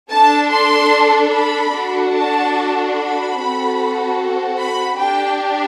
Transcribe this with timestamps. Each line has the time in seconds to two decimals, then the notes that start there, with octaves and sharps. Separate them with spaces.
0.11 D4 A4 A5
0.51 C6
1.32 B5
1.72 D4 F#4 A4
2.14 A5
2.95 B5
3.36 C4 F#4 A4
4.58 B5
4.98 D4 G4 G5